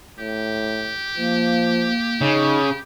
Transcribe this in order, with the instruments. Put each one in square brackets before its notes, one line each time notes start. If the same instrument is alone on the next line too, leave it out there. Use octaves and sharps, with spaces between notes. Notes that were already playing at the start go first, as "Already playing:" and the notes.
[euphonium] A2 [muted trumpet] G4
[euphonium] F3 [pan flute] A#3
[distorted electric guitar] C#3 [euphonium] D#4